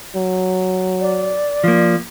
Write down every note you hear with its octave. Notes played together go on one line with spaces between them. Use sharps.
F#3
D5
F3 A#3